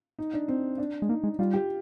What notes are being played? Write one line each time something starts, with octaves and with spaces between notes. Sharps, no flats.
D#4
D4
C4
D4
G#3
A#3 D#4
G#3
G3 F4
G4